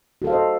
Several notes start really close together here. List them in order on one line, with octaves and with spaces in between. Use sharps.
F#4 A4 F5 C5 D#5